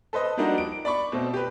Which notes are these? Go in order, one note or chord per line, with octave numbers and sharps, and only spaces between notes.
A4 B4 C5 D#5
F3 G3 A#3 D4 D#4 F#4
D7
D5 B5 C#6
B2 A3 C4
G4 B4